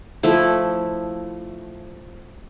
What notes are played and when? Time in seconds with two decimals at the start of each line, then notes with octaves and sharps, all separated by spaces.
0.23 F3 A3 E4